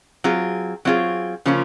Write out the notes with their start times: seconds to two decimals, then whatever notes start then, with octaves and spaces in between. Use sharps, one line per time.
0.24 F#3 C4 F4 G#4
0.85 F#3 C4 F4 G#4
1.46 C#3 F3 A#3 C#4 F4